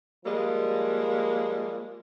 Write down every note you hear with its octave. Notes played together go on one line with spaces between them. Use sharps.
F3 G3 G#3 A#3